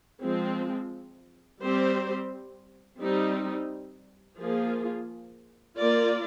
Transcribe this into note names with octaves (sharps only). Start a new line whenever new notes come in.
F3 G#3 C4
G3 C4 G4 C5
G3 C4 D#4
F3 A#3 F4 G#4
A#3 F4 A#4 D5